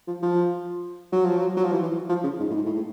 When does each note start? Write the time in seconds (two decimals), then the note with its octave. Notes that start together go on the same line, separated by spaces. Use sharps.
0.07 F3
0.22 F3
1.12 F#3
1.25 F3
1.38 F#3
1.57 F#3
1.64 F3
1.72 E3
1.82 E3
2.09 F3
2.24 C#3
2.39 G#2
2.50 A2
2.55 G#2
2.65 A2
2.75 A2